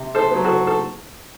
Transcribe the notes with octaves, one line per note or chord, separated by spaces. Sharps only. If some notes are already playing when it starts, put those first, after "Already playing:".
Already playing: C3
A4 C5
B3
F#3
F#4 A4
A4